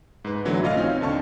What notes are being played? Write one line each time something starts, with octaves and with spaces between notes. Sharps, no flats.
G#2 B4
D3 E3 F#3 A3 B3 E4
A#1 F4 D#5 F5 F6
C4 C#4 D#4
D#2 D3 A5 C#6